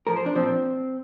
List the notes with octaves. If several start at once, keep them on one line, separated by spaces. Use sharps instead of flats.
A2 F3 A#4
C5
D4
A#2 F3 C4